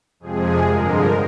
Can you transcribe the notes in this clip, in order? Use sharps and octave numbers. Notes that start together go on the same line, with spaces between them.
F2 C3 F3 G#3 G#4
G2 D3 F3 G#3 A#4